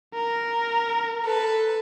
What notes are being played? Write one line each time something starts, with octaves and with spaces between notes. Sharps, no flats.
A#4
A4 B4